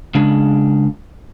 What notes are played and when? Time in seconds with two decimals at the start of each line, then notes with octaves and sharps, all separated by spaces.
0.15 C#3 G#3 D4